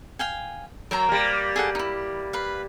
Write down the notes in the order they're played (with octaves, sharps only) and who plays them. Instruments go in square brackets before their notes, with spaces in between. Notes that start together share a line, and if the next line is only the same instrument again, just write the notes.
[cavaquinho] F5 G5 G#5
[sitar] F#3 [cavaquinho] A#4 C5 A#5
[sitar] G3 A#3
[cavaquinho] G#4 A4 F#5
D#4 E4
B4 F5